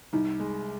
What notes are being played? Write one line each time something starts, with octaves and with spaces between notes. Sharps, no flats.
C2 D#4
G#3